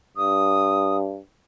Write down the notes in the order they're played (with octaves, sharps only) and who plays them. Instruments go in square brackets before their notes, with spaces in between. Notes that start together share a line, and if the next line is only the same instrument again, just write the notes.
[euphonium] G2 [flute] D#6